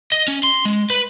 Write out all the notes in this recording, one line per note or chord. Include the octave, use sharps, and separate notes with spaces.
D#5
C#4
C6
G#3
B4